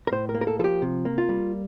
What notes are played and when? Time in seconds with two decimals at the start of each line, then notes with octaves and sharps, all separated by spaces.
0.07 A#4
0.12 A2 C5
0.29 A#4
0.35 A#3
0.41 A#4
0.47 A4
0.59 F3 A4
0.64 G4
0.82 C3
1.05 A#3
1.18 F4
1.29 G3